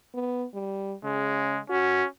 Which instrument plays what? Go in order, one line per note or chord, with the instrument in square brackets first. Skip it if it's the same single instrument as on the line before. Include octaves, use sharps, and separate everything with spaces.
[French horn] B3
G3
[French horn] C#3 [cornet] G#3
[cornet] C#4 [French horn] F#4